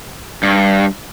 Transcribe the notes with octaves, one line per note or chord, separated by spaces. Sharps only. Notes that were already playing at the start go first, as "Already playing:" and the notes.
G2